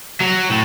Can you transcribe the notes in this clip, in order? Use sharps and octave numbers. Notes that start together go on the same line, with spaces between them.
F#3
A2